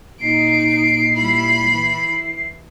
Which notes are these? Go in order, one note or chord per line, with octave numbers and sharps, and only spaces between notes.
A#2 D#4 C7 D7
G3 E4 F4 B5
E3 E4